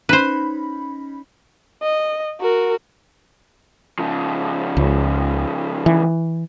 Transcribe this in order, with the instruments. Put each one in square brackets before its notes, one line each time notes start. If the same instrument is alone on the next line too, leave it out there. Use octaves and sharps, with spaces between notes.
[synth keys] C#4 D#4 B5 [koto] B4 C5
[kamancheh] D#5
F#4 A#4
[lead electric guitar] C#3 F3
[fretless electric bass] C#2
E3